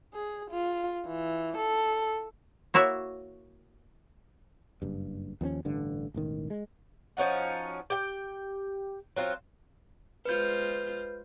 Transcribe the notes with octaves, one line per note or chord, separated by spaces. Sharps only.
G#4
F4
E3
A4
A#3 E4 F#4 C#5 E5
F#1 G2
D#2 F3 B3 C#4
A1 G2 D3
E1 A1 D#3
G#3
F3 C#4 D#4 F#4
G4 G5
F#3 C4 F4
G#3 F4 B4 C5 G6